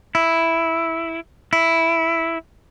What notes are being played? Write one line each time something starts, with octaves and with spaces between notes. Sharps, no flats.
E4
E4